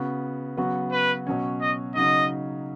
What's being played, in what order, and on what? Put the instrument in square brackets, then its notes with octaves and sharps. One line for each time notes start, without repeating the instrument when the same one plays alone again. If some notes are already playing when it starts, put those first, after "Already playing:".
Already playing: [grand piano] C#3 B3 F#4
C#3 F#3 B3 F#4
[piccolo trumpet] B4
[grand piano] B2 F#3 C#4
[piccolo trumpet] D#5
[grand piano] C#3 F#3 D#4 [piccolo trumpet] D#5